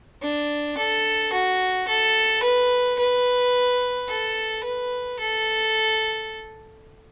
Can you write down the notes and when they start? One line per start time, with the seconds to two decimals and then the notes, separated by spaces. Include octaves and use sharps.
0.22 D4
0.78 A4
1.33 F#4
1.88 A4
2.43 B4
2.99 B4
4.09 A4
4.64 B4
5.19 A4